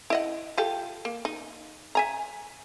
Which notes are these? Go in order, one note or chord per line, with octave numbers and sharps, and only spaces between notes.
E4 D#5 F#5
F4 G4 A4
A#3
D#4
E5 G#5 A#5